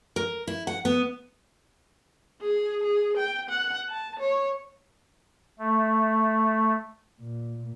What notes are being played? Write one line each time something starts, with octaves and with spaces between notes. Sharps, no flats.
A#4
E4
F#5
B3
G#4
G#4
G5
F#5
A5
C#5
A3
A#2